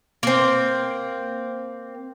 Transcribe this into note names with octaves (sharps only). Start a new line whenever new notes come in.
A#3 C4